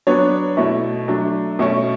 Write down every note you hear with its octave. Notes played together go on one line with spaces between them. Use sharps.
F#3 B3 D4 C#5
B2 A3 E4
F#3 A3 D4
B2 A3 C#4